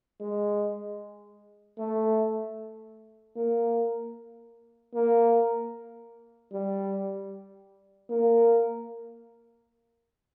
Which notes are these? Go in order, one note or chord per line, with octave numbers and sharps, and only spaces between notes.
G#3
A3
A#3
A#3
G3
A#3